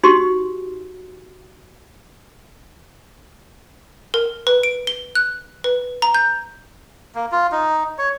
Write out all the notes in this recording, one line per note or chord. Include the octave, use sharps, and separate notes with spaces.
D#4 F#4 G4 C6
A#4
B4
D7
G7
F#6
B4
A#5
G6
A#3
F4
D#4
C#5